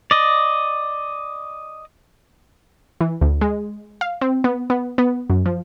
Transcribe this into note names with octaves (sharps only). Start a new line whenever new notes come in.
D5 D#5
E3
D2
G#3
F5
C4
B3
B3
B3
F#2
F3